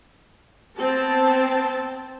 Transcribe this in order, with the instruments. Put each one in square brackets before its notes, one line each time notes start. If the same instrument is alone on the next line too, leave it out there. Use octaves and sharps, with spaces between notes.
[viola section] B3 C4 A5